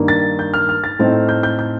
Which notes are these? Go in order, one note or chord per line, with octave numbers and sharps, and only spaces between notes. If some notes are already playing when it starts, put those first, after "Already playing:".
Already playing: G2 D#3 A#3
A6
G6
F6
F6
A6
A2 A3 C4 D#4
G6
G6
G6